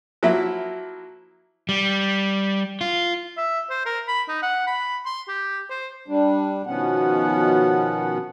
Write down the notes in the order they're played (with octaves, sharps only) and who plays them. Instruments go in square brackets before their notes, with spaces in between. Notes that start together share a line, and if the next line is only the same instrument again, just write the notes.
[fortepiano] F3 F#3 A#3 E4 E5
[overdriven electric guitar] G3
F4
[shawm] E5
C5
A#4
B5
D#4
F#5
B5
C6
G4
C5
[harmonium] G3 D4
B2 D#3 F3 B3 C#4 F#5